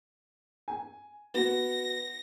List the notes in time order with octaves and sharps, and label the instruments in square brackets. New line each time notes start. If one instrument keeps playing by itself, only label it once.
[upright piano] G#5
[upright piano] B3 F#4 [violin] A#6